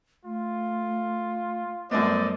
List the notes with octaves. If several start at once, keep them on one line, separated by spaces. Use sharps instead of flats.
A3 F4
F#2 G3 A3 B3 C5 D5 D#5